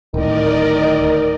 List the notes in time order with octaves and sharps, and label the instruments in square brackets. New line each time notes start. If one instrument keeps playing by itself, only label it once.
[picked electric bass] D1 A2 [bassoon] D#3 [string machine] A#4 D5 D#5